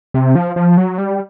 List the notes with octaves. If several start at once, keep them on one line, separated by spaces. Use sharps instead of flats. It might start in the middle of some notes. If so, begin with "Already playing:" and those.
C3
F3
F3
F#3
G3